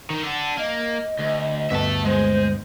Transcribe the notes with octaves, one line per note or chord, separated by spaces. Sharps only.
D#3
D4 A4 F#5
A#3 D#5
D2
D2 G2 B3 E5 A5
G#3 C5